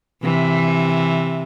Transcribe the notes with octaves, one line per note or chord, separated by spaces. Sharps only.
C3 E3